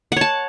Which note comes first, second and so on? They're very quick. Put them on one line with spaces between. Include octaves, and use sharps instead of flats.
F#5 C#5 A5